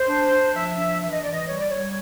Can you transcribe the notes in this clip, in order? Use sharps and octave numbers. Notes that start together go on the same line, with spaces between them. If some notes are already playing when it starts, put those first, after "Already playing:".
Already playing: C5
D4
D4
F3 E5
D4
E3 E5
D#5
E3 D5
D#5
G3 C#5
D5
G3 C#5